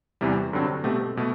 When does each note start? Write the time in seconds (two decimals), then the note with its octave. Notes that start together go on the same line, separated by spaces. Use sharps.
0.21 E2 C3 E3 G3
0.53 G2 D3 F#3 C4
0.84 B2 A3 C4 G4
1.17 B2 A3